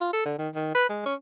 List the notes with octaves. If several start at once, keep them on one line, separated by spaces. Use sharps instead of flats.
F4
A4
D3
D#3
D#3
B4
G#3
C#4